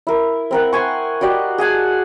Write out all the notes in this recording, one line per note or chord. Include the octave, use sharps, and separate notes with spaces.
E4 A#4
C4 A#4 F#5
C5 F#5 G#5 C#6
F#4 G4 D5 D#5
G#4 F#5 G#5 A5